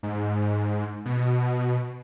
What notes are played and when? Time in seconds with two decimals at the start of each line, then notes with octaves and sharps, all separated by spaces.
0.03 G#2
1.05 B2